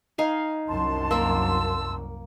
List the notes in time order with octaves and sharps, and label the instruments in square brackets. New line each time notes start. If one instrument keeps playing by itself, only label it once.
[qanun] D#4 F5 G#5
[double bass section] C2 F#2 [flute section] A5 C6
[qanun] A#3 [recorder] E6